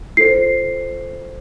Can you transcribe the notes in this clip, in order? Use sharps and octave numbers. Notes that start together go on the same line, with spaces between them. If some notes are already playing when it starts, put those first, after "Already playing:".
F4 A4 C5 C7